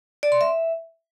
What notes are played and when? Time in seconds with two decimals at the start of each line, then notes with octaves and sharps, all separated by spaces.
0.23 D5
0.32 C6
0.41 E5